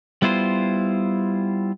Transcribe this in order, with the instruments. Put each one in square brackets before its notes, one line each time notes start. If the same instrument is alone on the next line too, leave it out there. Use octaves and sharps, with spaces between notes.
[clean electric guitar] G3 B3 E4 F4 C5